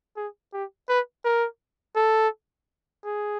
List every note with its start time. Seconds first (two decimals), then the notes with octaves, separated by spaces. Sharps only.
0.17 G#4
0.53 G4
0.89 B4
1.25 A#4
1.96 A4
3.05 G#4